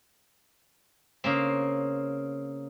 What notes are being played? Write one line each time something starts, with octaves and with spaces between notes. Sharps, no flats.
C#3 A#3 C4